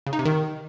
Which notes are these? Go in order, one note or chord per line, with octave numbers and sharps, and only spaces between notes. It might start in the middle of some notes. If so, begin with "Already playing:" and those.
C#3
D#4
C3
D#3